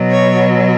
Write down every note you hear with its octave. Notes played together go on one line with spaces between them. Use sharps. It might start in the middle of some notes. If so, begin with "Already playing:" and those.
Already playing: B2 F#3
C#5